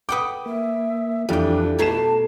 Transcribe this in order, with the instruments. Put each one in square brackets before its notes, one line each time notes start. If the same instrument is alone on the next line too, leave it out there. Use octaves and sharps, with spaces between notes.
[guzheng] B4 F#5 G5 [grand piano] D6 D#6
[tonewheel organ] A#3 [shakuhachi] E5
[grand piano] F2 E3 [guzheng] G3 G5 [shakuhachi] D4 [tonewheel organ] E4 F4 A4
[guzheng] B2 A3 A#5 [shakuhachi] A5 [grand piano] G#6 C7 E7